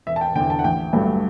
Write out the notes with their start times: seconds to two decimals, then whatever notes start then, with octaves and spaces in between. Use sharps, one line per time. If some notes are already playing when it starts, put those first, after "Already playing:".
0.06 E1 E5
0.16 A5
0.21 G5
0.35 D3 G5
0.40 E2
0.50 A5
0.59 F#5
0.64 A1 G5
0.93 G2 F#3 A3